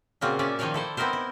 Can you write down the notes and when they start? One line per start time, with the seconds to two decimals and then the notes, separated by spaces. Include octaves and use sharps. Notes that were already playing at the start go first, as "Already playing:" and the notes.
0.21 A#2 C#3 A#3 C4 F4 F#4
0.39 C#4 D5 E5
0.59 D#3 F3 D#4 C#5 D5 F5
0.74 E4 A4 C5
0.97 B3 C4 D#4 E4 A#4 C5
1.13 E4